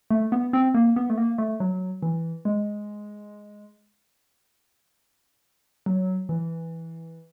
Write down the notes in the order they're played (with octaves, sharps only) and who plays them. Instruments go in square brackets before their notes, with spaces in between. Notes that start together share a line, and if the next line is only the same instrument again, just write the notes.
[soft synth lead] A3
B3
C4
A#3
B3
A3
A#3
A3
F#3
E3
G#3
F#3
E3